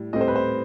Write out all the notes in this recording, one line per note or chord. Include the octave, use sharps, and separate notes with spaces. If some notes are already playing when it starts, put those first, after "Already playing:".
Already playing: A2 G3
A2 G3 C4 D#5
C5
B4
C5